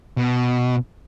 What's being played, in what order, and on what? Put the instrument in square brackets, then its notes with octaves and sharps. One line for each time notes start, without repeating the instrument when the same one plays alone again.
[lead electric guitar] B2